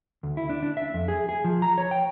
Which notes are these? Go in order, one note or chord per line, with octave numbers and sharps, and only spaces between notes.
D2
E4
D4
D4
E5
F2
G#4
G#4
F3
A#5
C#5
G5